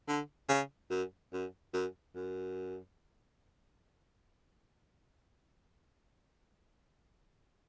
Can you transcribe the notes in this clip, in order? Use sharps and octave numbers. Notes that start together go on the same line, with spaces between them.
D3
C#3
F#2
F#2
F#2
F#2